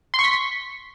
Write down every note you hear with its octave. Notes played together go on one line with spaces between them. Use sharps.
C6
C#6
B6